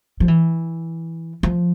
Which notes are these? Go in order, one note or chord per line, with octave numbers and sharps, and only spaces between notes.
F3
E3
F3